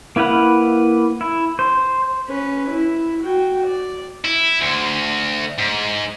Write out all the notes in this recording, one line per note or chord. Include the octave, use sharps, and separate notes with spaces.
A#3 E4 B4 F5 F#5
E4
C5
C#4 B4
E4
F#4 G5
D5
E4
D2
G#2